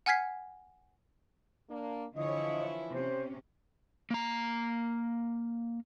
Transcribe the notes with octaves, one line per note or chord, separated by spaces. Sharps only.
F#5 G#5 F6 G#6 B6 C7
A#3 D4
D3 E3 F3 E4 C#5 D#5
C3 C#4 C5
A#3 A#5